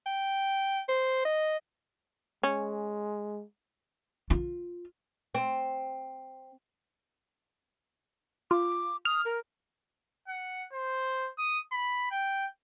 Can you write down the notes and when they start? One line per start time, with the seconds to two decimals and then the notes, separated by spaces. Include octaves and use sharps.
0.06 G5
0.88 C5
1.25 D#5
2.43 G#3 C#4
4.30 F4
5.35 C4
8.51 F4 D6
9.05 D#6 F6
9.25 A#4
10.28 F#5
10.73 C5
11.38 D#6
11.72 B5
12.11 G5